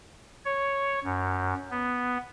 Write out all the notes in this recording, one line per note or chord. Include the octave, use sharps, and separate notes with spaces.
C#5
F#2
B3